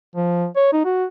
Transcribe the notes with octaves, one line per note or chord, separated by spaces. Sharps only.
F3
C#5
D#4
F#4